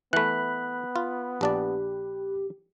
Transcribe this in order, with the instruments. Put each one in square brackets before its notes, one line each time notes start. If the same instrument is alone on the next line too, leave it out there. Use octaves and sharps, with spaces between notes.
[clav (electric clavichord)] E3 A3 [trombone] B3 [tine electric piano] B5 F#6
[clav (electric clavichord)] F4
[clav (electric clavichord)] A#1 D4 D5 [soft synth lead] G4